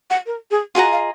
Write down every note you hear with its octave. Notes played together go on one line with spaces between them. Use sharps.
F#5
A#4
G#4
F4 F#4 G#4 D#5 A#5
F5